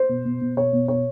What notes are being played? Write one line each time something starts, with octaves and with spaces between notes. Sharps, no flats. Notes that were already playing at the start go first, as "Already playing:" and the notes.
Already playing: C5
B2
B2
B2
B2 C#5
B2
B2 C#5